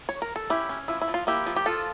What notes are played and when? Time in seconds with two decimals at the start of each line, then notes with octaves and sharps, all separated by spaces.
0.09 C#5
0.22 A#4
0.36 A4
0.50 C#4 E4 G4
0.69 C#4
0.88 F3 E4
1.02 E4
1.08 F3
1.14 F4
1.27 A#3 E4 G4
1.46 F3
1.56 G4
1.66 F3 F4 A4